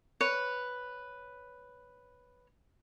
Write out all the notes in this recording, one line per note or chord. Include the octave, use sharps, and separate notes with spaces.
B4 C#5